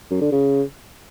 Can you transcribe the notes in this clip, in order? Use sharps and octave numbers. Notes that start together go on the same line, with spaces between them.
F#2
D3
C#3